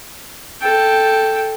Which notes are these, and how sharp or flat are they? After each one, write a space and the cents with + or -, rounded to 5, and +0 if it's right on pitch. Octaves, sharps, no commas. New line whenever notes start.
A4 +0 G5 +0